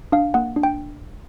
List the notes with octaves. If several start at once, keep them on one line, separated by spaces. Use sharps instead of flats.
D4 F5
A#3 F#5
D4
G5